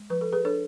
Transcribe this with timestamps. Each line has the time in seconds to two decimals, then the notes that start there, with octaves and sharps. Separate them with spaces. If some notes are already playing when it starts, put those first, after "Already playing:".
Already playing: G#3
0.10 F3 B4
0.21 A4
0.32 G#4 B4
0.45 D4 A4 C#5